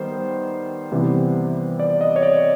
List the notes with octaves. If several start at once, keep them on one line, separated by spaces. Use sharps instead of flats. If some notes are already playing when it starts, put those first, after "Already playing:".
Already playing: D#3 G3 B3 C5
C3 E3 G3 B3
D5
D#5
C#5
D5